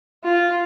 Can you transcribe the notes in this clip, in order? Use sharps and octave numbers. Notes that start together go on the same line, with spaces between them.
F4